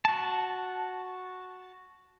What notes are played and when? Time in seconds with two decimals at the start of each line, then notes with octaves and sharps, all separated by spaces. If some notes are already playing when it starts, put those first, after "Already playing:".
0.05 F#4 A5